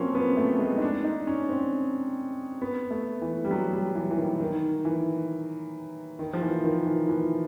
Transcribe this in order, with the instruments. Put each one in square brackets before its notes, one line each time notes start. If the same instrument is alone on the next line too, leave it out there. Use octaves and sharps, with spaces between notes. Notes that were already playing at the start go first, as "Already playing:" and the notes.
Already playing: [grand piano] F3 F#3 A#3 C4 C#4
B3
A3
G#3
D#4
D4
D#4
C#4
C4
B3
A3
E3
G3
F#3
G3
E3
E3
D#3
D#3
E3
D#3
F3
E3
D#3
E3
E3